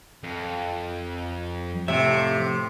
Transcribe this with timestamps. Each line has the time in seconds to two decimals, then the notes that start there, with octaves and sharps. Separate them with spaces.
0.24 F2
1.88 F2 A2 C3 G3 E5